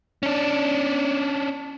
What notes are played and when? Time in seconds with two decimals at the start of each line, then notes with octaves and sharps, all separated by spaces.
0.23 C#4 D4